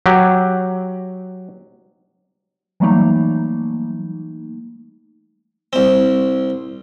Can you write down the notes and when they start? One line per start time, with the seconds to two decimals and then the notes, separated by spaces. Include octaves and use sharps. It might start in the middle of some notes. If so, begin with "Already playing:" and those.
0.06 F#3 G4
2.80 E3 F#3 G3 A3 A#3 D#4
5.73 C2 C4